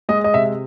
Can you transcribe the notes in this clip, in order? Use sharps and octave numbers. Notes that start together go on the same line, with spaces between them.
G#3 D#5
D#5
C3 E5